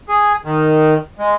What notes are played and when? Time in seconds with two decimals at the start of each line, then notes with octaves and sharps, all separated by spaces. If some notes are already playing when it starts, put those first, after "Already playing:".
0.09 G#4
0.45 D#3
1.19 G#3